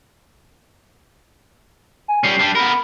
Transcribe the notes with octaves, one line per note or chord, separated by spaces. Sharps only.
G#5
G3 C#4 C7
G3 D4
B3 A#4 B5
B5